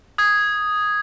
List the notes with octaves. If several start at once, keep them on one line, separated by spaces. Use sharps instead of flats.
D#6 G#6